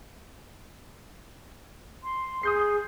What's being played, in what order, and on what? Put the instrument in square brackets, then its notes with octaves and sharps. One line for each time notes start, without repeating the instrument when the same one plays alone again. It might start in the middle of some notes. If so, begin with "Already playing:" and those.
[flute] C6
[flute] G#4 [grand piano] D#6 G6 C7